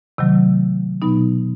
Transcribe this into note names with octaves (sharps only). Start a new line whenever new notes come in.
C3 D#3 F#3 A3
B2 F#3 B3 D#4